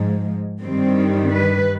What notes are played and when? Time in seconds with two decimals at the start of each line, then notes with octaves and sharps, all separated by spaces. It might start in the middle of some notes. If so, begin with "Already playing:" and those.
Already playing: G#2 F3 G#3
0.62 G2 D#3 G3 C4
1.33 B4